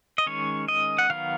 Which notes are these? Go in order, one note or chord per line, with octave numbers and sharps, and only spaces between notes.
D#5
D#3 G#3 C#4 C#5
D#5
F#5
D#3 F#3 B3 F5